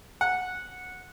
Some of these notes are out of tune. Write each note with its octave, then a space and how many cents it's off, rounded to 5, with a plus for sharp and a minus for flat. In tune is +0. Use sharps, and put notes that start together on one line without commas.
F#5 -10